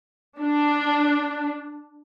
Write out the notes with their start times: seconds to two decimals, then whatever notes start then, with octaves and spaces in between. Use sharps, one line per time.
0.39 D4